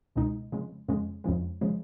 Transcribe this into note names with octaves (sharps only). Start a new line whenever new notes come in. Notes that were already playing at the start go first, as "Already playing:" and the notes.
C#2 B2 G#3 D#4
F2 C#3 G#3
F2 C#3 G#3
F2 C#3 F3 G#3
C#3 F3 G#3